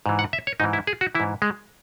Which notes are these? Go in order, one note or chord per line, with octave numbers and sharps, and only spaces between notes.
G#2 E3
F#5
E5
C#5
G#2 E3 D#4
E4
G#4
F#4
E3 E4
G#2
G#3